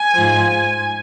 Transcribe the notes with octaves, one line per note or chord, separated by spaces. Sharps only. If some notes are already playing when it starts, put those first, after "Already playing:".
Already playing: G#5
G#2 F3